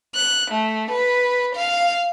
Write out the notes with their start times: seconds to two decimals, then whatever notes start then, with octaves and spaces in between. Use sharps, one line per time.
0.15 F#6
0.51 A3
0.91 B4
1.56 F5